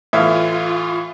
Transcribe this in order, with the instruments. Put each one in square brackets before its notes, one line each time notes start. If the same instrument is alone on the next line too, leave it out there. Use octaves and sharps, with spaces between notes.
[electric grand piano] A2 E3 [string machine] F4 [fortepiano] E5 F5